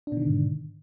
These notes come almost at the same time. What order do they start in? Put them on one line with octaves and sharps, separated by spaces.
D4 B2 D#3 D3 G#2